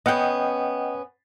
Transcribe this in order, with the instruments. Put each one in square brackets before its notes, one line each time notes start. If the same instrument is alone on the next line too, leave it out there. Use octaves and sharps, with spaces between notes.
[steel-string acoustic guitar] B3 C#4 [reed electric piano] D#5 F#5 G5